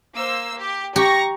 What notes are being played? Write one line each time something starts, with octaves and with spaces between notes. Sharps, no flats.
A#3 C5 E6
G4
G4 A#5 C#6 A#6